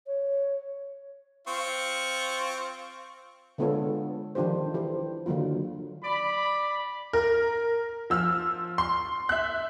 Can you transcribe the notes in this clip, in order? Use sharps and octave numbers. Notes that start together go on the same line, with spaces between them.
C#5
C4 F4 C#6
D3 G#3 B3 F4 A4 C#5
D#3 F3 D4 F4 G4 C5
E3 G4 C5
D3 D#3 F#3 A#3 F4
D5 B5
A#4
F3 E6 F6
C6
E5 F#6